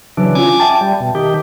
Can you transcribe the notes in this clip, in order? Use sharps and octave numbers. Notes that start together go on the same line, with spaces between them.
C#3 E3 F#3 D4
C#4 F4 G#5 D6
E5 G5 A5
G3
B2
D#3 G4